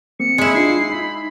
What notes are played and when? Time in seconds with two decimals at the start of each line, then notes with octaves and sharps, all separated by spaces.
0.20 A#3 C4 C#7
0.38 G#3 E4
0.54 D4 D#4 F4 C7
0.90 D#4 B5